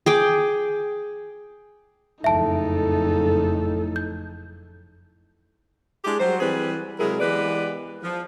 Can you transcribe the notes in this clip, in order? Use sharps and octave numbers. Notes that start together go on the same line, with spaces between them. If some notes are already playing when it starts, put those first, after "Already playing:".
G#4 G5 D6
F#1 F2 A2 D#4 A4 E5 A5
G6
G#3 D4 E4 G4 G#4
F#3 G3 F#4 C5
E3 G3 C4 G#4 B4
C3 F#3 G#3 E4 G#4 A#4
E3 G#3 B3 G4 B4 D5
F3